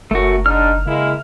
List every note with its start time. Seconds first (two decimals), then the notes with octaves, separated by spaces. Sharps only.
0.11 F#1 F#2 A3 F#4 A#4
0.46 G#2 D4 D#4 F6
0.86 C#3 G#3 A#3 E4